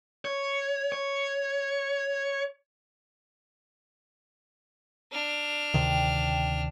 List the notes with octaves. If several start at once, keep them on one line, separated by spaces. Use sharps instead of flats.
C#5
C#5
D4 F6
D2 C3 D#3 G5